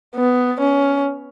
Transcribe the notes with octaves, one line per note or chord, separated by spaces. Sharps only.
B3
C#4